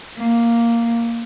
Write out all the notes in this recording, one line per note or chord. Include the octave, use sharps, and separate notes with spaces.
A#3